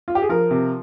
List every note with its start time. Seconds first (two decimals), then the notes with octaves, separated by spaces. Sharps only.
0.08 F4
0.15 G4
0.22 G#4
0.29 F3 A#4
0.51 C3